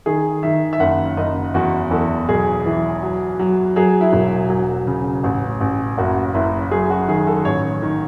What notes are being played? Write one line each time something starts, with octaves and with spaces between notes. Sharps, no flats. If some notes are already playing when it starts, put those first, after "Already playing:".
D#3 G#4
D#3 E5
E5
F#1 F#5
F#1 D#5
E2 F#4
E2 A4
B1 G#4
E3
F#3
F#3
F#3 G#4
E4
E1
F#3
C#3
A1
A1
F#1 F#4
F#1 E4
F#3 G#4
F#4
D#3 G#4
A4
A1 C#5
D#3